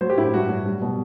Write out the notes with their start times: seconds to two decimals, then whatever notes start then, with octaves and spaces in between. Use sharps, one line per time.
0.01 F#3 C5
0.10 G4
0.17 A2 E4
0.33 G2 F#4
0.49 F#3
0.66 G3
0.82 B2